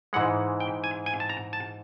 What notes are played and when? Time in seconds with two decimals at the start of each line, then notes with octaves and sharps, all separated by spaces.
0.13 G#2 E3 G#3 F#5
0.60 G5
0.84 G#5
1.06 G#5
1.20 A5
1.29 A#5
1.53 A5